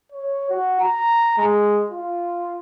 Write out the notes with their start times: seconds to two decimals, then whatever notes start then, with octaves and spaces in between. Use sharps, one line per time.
0.12 C#5
0.50 F#4
0.80 A#5
1.38 G#3
1.90 F4